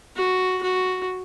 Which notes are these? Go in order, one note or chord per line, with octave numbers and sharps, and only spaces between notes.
F#4
F#4